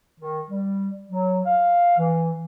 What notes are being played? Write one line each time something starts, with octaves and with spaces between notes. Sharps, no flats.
D#3
G3
F#3
F5
E3